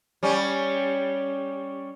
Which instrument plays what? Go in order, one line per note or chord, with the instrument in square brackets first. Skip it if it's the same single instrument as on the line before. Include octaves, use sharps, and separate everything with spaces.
[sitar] G3 C#4